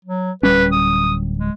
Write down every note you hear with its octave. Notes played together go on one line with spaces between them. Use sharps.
F#3
D1 G3 C#4 B4
D#6
G#3